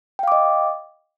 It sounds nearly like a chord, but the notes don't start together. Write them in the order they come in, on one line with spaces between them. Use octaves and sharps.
G5 F5 D6 D#5